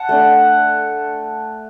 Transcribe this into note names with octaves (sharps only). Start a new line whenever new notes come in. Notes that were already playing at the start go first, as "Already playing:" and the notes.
Already playing: F#5 A5
A3 D4